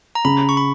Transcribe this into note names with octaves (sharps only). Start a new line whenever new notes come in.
A#5
C#3 B5
C#6
B5